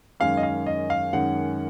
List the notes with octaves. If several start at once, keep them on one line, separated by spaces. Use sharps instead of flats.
F#2 D#3 G#3 C#4 F5
D#5
F5
D#5
F5
F#2 D#3 G#3 C#4 F#5